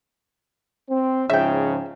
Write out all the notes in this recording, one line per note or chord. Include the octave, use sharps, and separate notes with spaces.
C4
G#2 C#3 F3 E5 G5